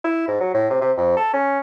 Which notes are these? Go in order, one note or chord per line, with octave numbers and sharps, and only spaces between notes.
E4
G#2
F#3
A2
C3
C3
F2
A4
C#4